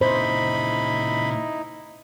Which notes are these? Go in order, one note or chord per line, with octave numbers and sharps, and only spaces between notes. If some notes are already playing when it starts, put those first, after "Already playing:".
A#2 C#3 D#4 E4 C5 B5